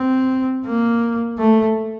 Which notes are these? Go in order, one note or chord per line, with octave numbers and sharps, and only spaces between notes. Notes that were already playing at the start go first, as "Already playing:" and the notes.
Already playing: C4
A#3
A3